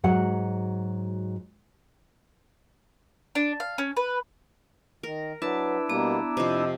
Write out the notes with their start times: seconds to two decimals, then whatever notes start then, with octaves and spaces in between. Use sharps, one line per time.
0.04 G#2 F#3 F#4 F#5
3.35 D4
3.60 F5
3.78 C#4
3.97 B4
5.03 D#3 A#4
5.42 F#3 D4 E4 B4 A5
5.89 B2 G3 A#3 B3 A#5 D6
6.37 F2 C3 F3 D#5 D6 E6